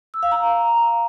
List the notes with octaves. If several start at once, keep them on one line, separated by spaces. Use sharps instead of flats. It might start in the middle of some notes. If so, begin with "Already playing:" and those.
E6
F5
A#5